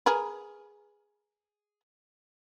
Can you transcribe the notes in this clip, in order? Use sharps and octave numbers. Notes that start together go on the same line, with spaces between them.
G#4 A#4 B4